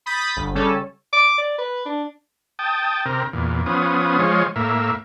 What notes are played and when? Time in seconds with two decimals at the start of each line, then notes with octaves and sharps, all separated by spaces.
0.06 B5 D#6 G6 A6 B6
0.36 G1
0.54 C#3 G3 C#4 A4
1.13 D6
1.38 D5
1.58 B4
1.86 D4
2.59 G5 A5 D#6
3.06 C3 A#4
3.33 E2 A#2
3.66 F3 B3 C#4 D#6
4.19 F3 G#3 C#5
4.56 A2 A#3 E5